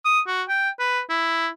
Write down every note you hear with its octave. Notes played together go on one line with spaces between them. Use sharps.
D#6
F#4
G5
B4
E4